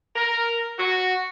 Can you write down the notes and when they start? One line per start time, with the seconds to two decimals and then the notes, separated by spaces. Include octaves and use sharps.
0.15 A#4
0.78 F#4